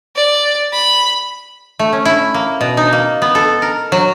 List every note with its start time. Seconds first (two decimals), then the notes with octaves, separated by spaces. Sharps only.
0.16 D5
0.73 B5
1.79 A3
1.93 C#4
2.05 E4
2.34 A#3
2.61 B2
2.77 D#4
2.93 A#3
3.22 B3
3.35 A4
3.62 A#4
3.92 F#3